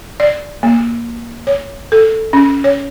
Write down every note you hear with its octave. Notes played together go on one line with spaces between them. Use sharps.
D5
A#3
C#5
A4
C#4
C#5